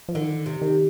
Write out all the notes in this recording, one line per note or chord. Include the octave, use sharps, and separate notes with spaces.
F3
D3 D#3
C3
D#3